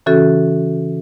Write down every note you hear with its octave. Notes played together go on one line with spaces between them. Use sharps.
C#3 E3 C#4 F#4 A4